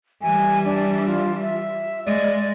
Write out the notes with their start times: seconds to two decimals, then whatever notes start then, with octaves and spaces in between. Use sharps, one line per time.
0.22 E3 G3 G#5
0.65 D4
1.06 F4
1.42 E5
2.06 G#3 D5